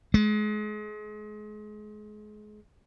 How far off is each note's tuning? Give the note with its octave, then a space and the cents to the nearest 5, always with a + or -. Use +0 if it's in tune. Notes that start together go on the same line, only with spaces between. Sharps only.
G#3 +30